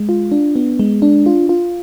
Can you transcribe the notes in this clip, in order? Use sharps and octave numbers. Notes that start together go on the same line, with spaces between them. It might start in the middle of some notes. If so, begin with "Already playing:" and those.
Already playing: G#3
F4
D4
B3
G#3
D4
F4
F4